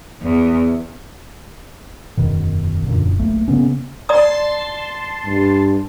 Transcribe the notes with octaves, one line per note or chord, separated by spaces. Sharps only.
E2
E1 F#2 B2 D#3
E1 F#2 A#2 D3
B1 A3 A#3
C#3 A#3 B3 C#4
D5 A5 A#5 C6 D#6
G2